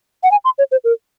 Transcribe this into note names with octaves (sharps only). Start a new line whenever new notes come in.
F#5
G#5
C6
C#5
C5
A#4